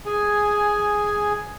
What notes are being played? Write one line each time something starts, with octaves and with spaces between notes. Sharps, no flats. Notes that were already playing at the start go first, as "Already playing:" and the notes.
G#4 G#5